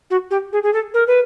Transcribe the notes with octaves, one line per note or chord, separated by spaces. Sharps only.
F#4
G4
G#4
G#4
A4
A#4
B4